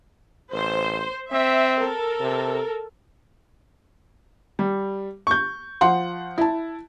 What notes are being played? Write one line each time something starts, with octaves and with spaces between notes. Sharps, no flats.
A1 C5
C4 E5
A4 A#4
C3
G3
C#6 G6
F3 F#5 C6
E4 A5